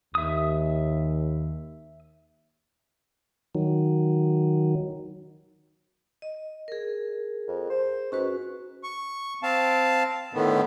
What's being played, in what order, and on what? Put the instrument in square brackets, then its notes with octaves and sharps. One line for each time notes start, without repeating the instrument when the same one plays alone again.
[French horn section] D#2 [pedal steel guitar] E5 D#6
[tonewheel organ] D#3 F#3
[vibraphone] D#5
G#4 A#4
[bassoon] F2
C5
[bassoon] G#2 [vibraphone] C#4 F#4 B4
[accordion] C#6
C4 F5 A5
A2 D3 D#3 B3